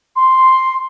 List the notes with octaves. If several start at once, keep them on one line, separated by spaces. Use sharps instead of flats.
C6